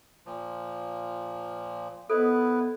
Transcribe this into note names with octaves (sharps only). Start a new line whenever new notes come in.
A#2 F3
B3 E4 A4 B4 C5 D#5